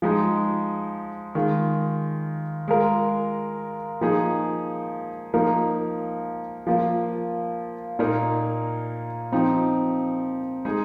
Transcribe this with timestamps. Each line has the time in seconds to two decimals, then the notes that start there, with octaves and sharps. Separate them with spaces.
0.02 F3 G#3 D#4
1.35 D#3 G#3 F4
2.68 G#3 F4 A#4
4.01 F3 A#3 D#4 G#4
5.34 F3 A#3 D#4 A#4
6.67 F3 A#3 F4
7.99 A#2 A#3 D#4 A#4
9.32 F3 C4 D#4
10.65 G#3 D#4 G#4